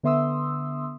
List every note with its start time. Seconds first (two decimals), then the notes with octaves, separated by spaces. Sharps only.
0.03 D3 B3 E5 C6 D#6 E6